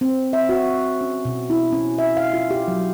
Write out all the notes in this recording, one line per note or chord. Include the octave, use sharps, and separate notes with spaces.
C4
E5
F#4
C#4
B2
E4
C#4
E5
F5
F4
G4
F#3